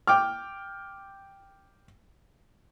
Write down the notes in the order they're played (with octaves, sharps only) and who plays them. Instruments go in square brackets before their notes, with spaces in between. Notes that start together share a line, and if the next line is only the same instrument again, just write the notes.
[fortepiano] G5 D6 F6